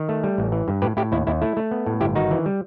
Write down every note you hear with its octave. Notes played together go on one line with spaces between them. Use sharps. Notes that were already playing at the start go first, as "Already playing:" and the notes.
Already playing: D#3
A3
G3
A1
E3
G2
A2 G4 B4
A2 E4 G4
D#2 E4
D#2 E4
A3 E4
A3
B3
A2
G1 E4 G4
D#3 D#4 F#4
E3
G3